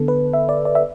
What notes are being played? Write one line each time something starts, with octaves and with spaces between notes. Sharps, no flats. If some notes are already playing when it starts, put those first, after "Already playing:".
Already playing: D3 B3 A4
B4
E5
D5
D5
E5